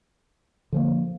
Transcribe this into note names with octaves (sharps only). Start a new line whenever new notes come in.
D3 F3 A#3